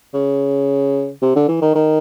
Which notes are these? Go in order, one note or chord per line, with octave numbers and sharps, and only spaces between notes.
C#3
C3
D3
E3
D#3
D#3